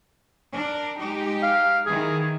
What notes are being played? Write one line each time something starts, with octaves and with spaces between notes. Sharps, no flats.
D4 A#4
G#3 D#4 G4
F5
D#3 E3 G#4